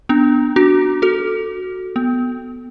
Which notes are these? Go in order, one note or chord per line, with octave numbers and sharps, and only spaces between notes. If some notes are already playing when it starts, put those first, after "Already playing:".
B3 D4
D4 F#4
F#4 A4
B3